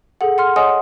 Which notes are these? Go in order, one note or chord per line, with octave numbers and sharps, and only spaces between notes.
G#4 A4 F#5
F#5 C6 F6
C#5 D#5 F#5 G#5 C6 D#6